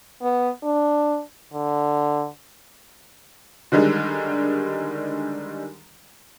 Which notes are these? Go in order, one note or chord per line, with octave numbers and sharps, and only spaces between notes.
B3
D4
D3
D3 D#3 G3 G#3